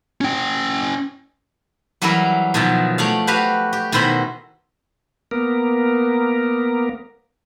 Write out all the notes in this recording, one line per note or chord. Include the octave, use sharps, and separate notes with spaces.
C#4 G5
E3 F#3 G3 C#4 E4 A#4
B2 D#3 F3 F#3 D#4 E5
A3 C#5 D5 F5
F#4 G4 B4 C#5 F5
G4
B2 D#3 C#4 E4 C5 B5
A#3 B3 A#4